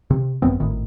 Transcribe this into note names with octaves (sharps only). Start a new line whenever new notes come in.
C3
G#1 F#2 B3 C4
G#1 A2 D#3